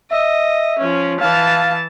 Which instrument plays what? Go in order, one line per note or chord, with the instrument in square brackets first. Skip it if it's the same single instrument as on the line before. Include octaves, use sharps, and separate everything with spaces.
[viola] D#5 [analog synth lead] E5
[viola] F3 C#4
[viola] E3 A5 [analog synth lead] F5